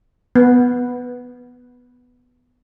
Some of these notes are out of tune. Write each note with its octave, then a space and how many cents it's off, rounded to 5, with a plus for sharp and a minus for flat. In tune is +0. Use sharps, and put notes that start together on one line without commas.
B3 +0